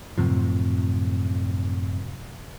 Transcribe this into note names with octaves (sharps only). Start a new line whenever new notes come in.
F#2 A2 C3 F3